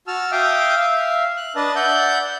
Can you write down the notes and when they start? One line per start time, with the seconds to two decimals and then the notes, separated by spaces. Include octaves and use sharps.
0.07 F#4 A5 E6 F6
0.32 E5 F5 G5 D6 D#6
0.77 E5 F5
1.37 F#6
1.56 D4 B4 D#5 A5
1.76 D5 E5 F#5 G6